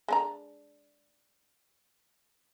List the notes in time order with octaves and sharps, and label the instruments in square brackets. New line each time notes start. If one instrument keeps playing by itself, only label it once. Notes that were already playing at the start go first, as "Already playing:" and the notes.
[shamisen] G#3 D4 A#5